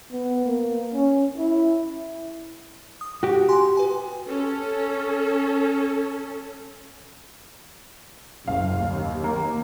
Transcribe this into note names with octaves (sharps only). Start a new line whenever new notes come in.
B3
A#3
C#4
E4
D#6
F#4 G4
G#5 C6
B4 G#5
C#4 A4
F#1 F5
D#2
A#3